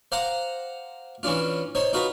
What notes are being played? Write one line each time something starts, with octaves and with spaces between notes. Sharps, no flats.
C5 F5 F#5 A#5 D6
E3 C#4 D4 F4
D#4 C5 C#5
D#4 F4 F#4 B4 A#5